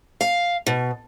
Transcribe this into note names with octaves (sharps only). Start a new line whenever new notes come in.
F5
B2